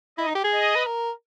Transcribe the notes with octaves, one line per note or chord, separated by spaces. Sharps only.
E4 D#5
D#4
G4
G#4
D#5
B4
A#4